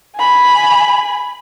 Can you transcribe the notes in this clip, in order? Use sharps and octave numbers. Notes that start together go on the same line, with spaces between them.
G#5 B5